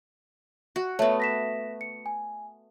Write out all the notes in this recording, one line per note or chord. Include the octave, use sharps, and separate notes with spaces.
F#4
A3 B3 C#5
A#6 B6 E7
C#7
G#5